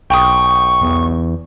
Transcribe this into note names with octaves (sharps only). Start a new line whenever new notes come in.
B1 G5 C#6 D#6
E2